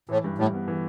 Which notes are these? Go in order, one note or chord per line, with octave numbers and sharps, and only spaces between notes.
A2 E3
G2
A2 G3
B3
E3